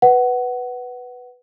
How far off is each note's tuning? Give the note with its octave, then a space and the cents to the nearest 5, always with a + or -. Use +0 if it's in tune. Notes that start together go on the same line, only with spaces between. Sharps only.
B4 +0 F#5 +15